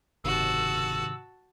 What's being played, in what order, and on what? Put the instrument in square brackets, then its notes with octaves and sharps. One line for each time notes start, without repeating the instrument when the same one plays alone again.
[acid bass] F#1 [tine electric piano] G#2 C3 D#3 [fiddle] F#4 A5 [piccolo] E6